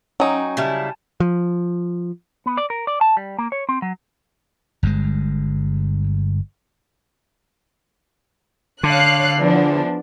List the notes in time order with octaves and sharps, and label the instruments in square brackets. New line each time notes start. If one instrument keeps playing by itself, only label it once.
[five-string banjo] F#3 D#4 [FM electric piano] C#4 [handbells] G5 G#5 C#6
[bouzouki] C#3 G3 E4 [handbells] G#5 A5
[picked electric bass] F3
[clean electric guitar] B3
D5
A#4
D5
A5
G3
A#3
C#5
C4
F#3
[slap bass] G1 G2 C3 G#3
[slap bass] D3 [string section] C#5 F5 F#6
[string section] E2 F3 D4